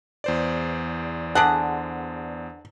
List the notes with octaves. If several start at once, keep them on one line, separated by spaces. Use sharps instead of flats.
E2 C5 D5
D3 G#4 F#5 A5